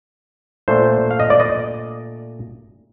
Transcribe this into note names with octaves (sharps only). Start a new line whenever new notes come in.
A#2 A3 D4 C5
F5
D#5
D5
D#5